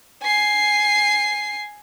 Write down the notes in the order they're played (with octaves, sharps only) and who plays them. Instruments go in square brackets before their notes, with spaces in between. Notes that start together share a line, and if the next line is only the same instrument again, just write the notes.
[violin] G#5 C7